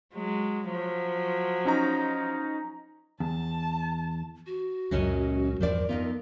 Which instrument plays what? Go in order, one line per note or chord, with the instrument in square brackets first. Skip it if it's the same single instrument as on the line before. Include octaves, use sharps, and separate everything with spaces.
[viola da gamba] F#3 G#3
F3 F#3
[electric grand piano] C#4 D#4 A#5
[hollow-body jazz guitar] E2 [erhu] A5
[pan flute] F#4
[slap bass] C#2 A#2 F#3 [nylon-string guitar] F#2 C#4 D#5
[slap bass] E2 G2 F3 [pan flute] A#4 [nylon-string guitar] C5 D5
[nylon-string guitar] F2 D#4 F4 [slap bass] B3